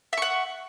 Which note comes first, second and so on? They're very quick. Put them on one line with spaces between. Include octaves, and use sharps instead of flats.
E5 C#6 F#5